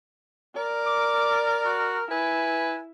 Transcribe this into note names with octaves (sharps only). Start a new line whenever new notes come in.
A#4 D5
D6
F#4
E4 B4 G#5